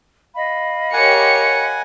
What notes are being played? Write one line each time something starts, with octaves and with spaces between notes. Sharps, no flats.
D#5 F5 B5
G4 A#4 C#5 F#5 G#5 C#7